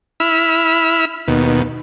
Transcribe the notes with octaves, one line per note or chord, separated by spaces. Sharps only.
E4 B5 E6 F6
D#2 B2